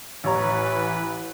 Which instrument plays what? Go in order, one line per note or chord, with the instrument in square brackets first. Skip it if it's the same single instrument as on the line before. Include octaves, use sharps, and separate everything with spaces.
[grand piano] A1 C#5 A#5 [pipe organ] E3 B4